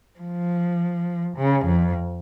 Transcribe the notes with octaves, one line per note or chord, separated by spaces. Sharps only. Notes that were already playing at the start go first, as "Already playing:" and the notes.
F3
C#3
F2